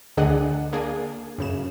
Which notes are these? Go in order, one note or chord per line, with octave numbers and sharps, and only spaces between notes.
D2 D3 D4 G#4 D#5 F#5
A#3 D4 G#4
F#2 C#3 E7